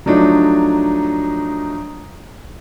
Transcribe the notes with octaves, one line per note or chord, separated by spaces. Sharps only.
F3 F#3 A3 D4 D#4